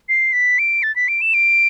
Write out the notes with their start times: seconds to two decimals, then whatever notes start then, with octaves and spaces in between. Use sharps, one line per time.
0.09 C7
0.33 B6
0.59 D7
0.83 A6
0.96 B6
1.08 D7
1.21 E7
1.34 D7